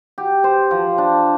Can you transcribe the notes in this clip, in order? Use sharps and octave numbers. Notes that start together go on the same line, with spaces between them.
G4
C5
F3
D4